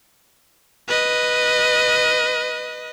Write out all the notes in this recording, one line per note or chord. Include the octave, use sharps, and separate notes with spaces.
B4 D#5